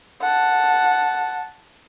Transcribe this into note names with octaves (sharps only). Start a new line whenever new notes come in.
F#5 A5